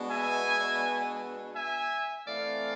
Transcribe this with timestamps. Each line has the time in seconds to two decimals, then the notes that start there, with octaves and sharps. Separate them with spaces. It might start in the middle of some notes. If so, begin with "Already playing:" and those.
Already playing: B2 G#3 B3 D4
0.09 E5 G#5
1.54 E5 G#5
2.26 E3 A3 C4 D5 F5